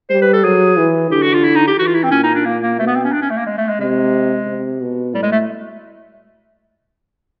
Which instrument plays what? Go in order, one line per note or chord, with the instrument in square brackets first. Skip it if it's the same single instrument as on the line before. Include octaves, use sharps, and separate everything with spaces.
[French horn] G3 [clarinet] C5
[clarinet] B4
A4
[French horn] F#3 [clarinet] G#4
[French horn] E3
[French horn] D3 [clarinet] G4
[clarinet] F#4
F4
E4
D#4
G4
[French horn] E3 [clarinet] F#4
[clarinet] F4
E4
C4
[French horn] A#2 [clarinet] C#4
[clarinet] D#4
D4
[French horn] A#2 [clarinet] A#3
[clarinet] A#3
[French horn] B2 [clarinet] A3
[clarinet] B3
C4
C#4
D4
C#4
A3
A#3
G#3
A3
G#3
[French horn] C3 [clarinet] G#3
[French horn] C3
B2
[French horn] A2 [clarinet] G3
[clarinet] G#3
A3